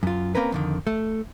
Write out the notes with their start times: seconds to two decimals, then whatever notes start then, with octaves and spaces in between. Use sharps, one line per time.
0.03 F#2 F4
0.35 A#3 C4 C#4 A#4 B4
0.52 F2 D3 D#3
0.87 A3